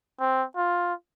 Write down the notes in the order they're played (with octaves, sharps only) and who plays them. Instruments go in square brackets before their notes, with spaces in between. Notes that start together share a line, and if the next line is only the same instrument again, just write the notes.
[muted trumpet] C4
F4